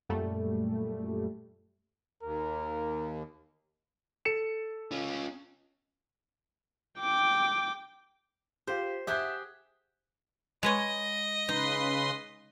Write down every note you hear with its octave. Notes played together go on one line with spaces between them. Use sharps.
F#2 A#2 G3 A3
D#2 A#4
A4 C#7 E7
C#4 F4
G5 D6
F4 G4 C5
G4 G#4 E5 F#5 G6
G#3 B4 C#5 D#5
C#3 D#4 B4 C6